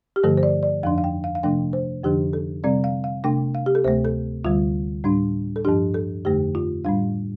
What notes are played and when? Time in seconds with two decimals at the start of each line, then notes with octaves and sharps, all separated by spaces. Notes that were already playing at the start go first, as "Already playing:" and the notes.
0.16 G4
0.23 G2 D3 F3 A3 A4
0.37 C5
0.43 D5
0.63 D5
0.83 F2 F3 D4 F5
0.98 F5
1.04 G5
1.24 F5
1.35 F5
1.43 C3 F3 A3 D4 G5
1.73 C5
2.04 F2 D3 F3 D4 G4
2.33 A4
2.64 C3 G3 C4 D5
2.84 F5
3.04 F5
3.24 C3 A3 D4 G5
3.55 F5
3.66 G4
3.75 A4
3.84 D2 C3 A3 C5
4.05 A4
4.44 D2 D3 G3 F4
5.04 A2 G3 D4
5.56 A4
5.64 G2 F3 D4 G4
5.94 A4
6.25 F2 D3 A3 G4
6.55 F4
6.84 A2 G3 D4 F5